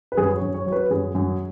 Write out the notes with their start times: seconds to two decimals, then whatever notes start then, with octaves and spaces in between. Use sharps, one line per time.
0.12 B4
0.17 F#2 G#4
0.36 C#5
0.42 F#2
0.54 C#5
0.66 F#3 C#5
0.72 B4
0.90 F#2 G#4
1.15 F#2